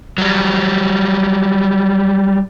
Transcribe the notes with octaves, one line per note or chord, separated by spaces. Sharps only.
F#3 G3